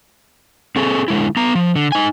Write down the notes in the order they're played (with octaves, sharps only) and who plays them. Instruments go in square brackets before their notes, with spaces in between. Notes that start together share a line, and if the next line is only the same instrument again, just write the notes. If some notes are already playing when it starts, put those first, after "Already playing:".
[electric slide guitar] C4 G#4 A4
D3 G#3 E4
B3 A#5
F3
D3
D#4 G#5